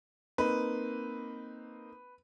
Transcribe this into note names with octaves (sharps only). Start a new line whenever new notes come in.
A#3 C4 D#4 B4